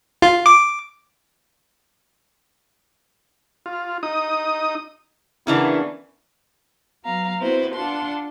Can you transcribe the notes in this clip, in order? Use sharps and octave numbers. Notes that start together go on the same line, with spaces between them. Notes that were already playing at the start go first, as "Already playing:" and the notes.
F4
D6
F4
D#4 D#6
C#3 E3 A#3 B3 D4 E4
F#3 B3 F5 A#5
B3 C4 E4 F#4 B4 C5
D4 F4 F#5 A5 C6